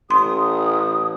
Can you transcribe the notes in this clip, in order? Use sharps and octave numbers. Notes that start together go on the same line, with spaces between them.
A1 C6 D#6